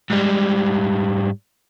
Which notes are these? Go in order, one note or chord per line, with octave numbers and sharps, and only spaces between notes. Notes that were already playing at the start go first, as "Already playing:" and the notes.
G#2 G3